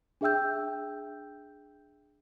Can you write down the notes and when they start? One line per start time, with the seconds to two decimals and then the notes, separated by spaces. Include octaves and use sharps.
0.21 D4 G#4 E5 G5 E6 G6